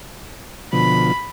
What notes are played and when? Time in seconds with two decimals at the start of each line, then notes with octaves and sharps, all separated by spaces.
0.73 B2 D3 F3 B5